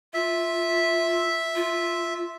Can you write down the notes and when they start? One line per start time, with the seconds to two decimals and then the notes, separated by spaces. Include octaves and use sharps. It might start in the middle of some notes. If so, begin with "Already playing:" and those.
0.14 F4 E5
1.56 F4